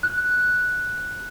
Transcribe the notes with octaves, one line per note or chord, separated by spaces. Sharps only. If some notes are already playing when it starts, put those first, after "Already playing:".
F#6